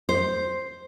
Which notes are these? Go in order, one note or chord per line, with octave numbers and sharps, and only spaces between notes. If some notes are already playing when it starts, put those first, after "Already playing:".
C5